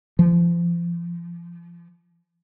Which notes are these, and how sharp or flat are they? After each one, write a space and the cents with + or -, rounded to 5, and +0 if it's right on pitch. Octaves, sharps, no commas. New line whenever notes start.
F3 -30